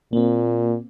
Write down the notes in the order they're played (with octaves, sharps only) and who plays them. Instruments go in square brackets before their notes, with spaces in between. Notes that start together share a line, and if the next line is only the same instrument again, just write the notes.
[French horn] A#2 [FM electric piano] A#3 C4